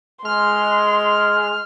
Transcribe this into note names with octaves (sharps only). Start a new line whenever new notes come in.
G#3 C6 F6